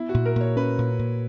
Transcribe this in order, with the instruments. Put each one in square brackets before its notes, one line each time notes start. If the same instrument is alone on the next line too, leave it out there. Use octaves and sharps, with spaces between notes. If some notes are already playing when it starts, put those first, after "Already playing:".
Already playing: [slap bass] B3 [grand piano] E4
[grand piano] F#4
[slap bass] A#2
[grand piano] A#4
[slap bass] A#2 [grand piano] C#5
[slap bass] C#4 [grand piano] B4
[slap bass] A#2
A#2